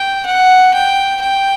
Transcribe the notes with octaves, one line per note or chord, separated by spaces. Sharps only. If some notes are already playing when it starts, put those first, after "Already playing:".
Already playing: G5
F#5
G5
G5